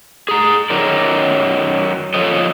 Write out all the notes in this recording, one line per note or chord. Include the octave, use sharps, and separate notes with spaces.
G#4 A#5
F#2 D#3 F#3 C#4 A#4 D5
A#2 F3 A4 C#5 D#5